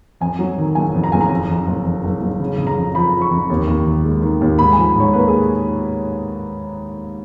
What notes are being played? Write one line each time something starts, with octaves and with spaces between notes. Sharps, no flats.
F2 G#5
F#3
D#3
F#1 G#5
F2
A#5
F#1 G#5
A#5
F2
F2
F#1
F2
F#1
F#1
C#3
C#3
A#5
F2
F3 B5
F3
C#6
F2
D#2
D#2
D#3
G#3
D#3
D#2
G#2 B5
G#5
F3
G#2 C#5
A#3 B4
G#4